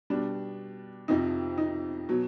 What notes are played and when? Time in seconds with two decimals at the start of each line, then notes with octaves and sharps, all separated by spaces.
0.10 B2 G3 D4
1.08 F2 C3 F3 D#4
1.58 D#4
2.09 B2 F#3